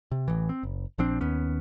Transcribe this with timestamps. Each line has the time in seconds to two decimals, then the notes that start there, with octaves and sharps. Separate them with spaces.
0.12 C3
0.28 A1 E3
0.49 C4
0.63 F#1
0.98 A#1 F3 C4 D4
1.21 D#2 B3 C#4